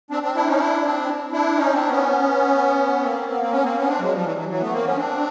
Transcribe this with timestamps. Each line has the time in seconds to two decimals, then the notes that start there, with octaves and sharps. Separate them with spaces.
0.11 C4 D4
0.22 C4 D4
0.35 D4 E4
0.47 C#4 D#4
0.59 D4 E4
0.84 C4 D4
1.32 D4 E4
1.57 C#4 D#4
1.73 C4 D4
1.89 B3 C#4
3.02 A#3 C4
3.30 B3
3.41 C4
3.51 B3 C#4
3.64 A#3 C4
3.76 B3 C#4
3.87 C4 D4
4.00 F#3 G#3
4.12 F3 G3
4.24 E3 F#3
4.36 E3 F#3
4.49 E3 F#3
4.60 A3 B3
4.73 A#3 C4
4.85 B3 C#4
4.97 C4 D4